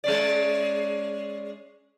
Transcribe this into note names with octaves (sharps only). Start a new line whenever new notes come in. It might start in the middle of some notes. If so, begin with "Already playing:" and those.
G#3 C#4 D5